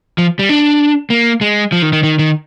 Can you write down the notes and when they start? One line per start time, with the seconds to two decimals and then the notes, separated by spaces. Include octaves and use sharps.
0.18 F3
0.39 G3
0.49 D4
1.10 A#3
1.41 G#3
1.72 F3
1.82 D#3
1.93 D#3
2.03 D#3
2.19 D#3